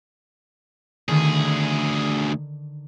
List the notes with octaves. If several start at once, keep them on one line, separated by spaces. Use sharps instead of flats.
D2 D3 D#3 G#4 B5